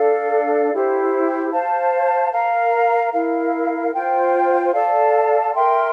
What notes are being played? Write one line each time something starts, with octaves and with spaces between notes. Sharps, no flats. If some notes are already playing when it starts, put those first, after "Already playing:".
Already playing: D4 A4 D5 F5
E4 G4 C5
C5 F5 A5
A#4 F5 A#5
E4 A#4 F5
F4 C5 G5
A4 D5 F5 A5
A#4 E5 G5 C6